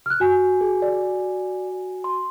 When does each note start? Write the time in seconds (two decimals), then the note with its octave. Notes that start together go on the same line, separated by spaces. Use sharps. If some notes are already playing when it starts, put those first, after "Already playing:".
0.06 F6 F#6
0.20 F#4 G#5
0.61 G#4
0.82 D5
2.04 C6